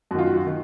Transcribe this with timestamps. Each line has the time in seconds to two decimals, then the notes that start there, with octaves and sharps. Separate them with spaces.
0.11 F#2 F#4
0.15 D#3 F4
0.26 F#4
0.47 D#3